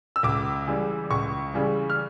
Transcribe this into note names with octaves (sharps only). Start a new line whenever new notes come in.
E6
C#2 D6
C#3 E3 G3
C#2 C#6
C#3 E3 G3
F6